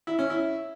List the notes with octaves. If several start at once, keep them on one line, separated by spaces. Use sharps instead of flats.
E4
C#4
E4